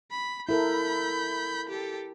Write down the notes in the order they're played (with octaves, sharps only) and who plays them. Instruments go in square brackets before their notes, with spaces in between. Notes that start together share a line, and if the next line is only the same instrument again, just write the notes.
[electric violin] B5
[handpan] E4 A4 A#4 [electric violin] B5 G6
[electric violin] G4 A4